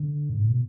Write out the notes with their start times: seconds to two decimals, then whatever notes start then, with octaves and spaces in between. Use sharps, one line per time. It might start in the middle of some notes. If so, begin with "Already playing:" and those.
Already playing: D3
0.30 G#2
0.40 A2
0.49 B2